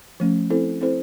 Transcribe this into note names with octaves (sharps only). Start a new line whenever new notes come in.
F3 A3 C#4
C4 E4 A4 C5
C4 E4 A4 C5